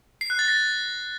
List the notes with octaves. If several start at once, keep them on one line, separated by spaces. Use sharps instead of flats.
C7
F#6
A6
A#6